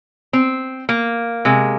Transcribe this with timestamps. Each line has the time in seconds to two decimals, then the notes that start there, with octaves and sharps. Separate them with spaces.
0.33 C4
0.89 A#3
1.45 C3 G#3